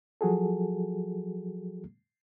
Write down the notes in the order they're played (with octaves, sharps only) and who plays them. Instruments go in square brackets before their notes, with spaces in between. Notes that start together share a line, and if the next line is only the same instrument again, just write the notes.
[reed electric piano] F3 F#3 F#4 G#4 A4